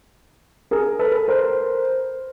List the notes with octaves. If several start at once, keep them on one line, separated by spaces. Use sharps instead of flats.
G#4 A#4
A4 B4
A#4 C5